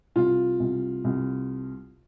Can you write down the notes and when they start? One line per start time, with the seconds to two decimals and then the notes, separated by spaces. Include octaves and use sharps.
0.16 C2 F4
0.60 C2
1.04 C2